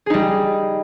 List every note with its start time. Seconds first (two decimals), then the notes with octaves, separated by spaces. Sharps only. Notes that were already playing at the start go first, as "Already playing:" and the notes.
0.06 G#4
0.10 D#4
0.14 G3